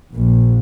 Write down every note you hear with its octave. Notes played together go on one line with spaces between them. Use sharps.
A#1